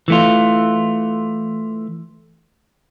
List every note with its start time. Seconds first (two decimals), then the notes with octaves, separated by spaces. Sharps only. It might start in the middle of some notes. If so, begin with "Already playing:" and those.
0.08 E3 A3 F4